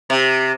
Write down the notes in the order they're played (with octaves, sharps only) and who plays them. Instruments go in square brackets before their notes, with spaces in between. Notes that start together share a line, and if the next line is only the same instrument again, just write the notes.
[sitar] C3